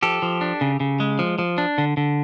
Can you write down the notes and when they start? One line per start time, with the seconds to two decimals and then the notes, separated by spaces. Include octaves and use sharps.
0.03 F3 G4 A4
0.22 F3
0.41 D4
0.61 C#3
0.80 C#3
1.00 G#3
1.19 F3
1.39 F3
1.58 D4
1.78 D3
1.97 D3